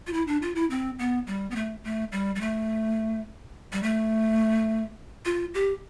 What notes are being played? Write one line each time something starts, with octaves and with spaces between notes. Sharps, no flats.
F4
E4
D4
F4
E4
C4
B3
G3
B3
A3
A3
G3
G3
A3
G3
A3
F4
G4